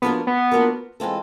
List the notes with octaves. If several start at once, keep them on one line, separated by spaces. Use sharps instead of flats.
F3 A#3 B3 D4 F#4 A#4
B3
F3 A#3 D4 F#4 A#4
E3 G#3 C4 F4 A4